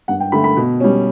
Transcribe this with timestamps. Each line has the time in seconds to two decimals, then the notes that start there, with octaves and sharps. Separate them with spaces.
0.08 G2 F#5
0.20 G5
0.32 D3 A3 B5
0.44 B5
0.57 B2
0.80 G3 C#4